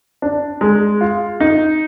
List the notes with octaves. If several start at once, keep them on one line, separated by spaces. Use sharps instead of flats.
D4
G#3
F4
D#4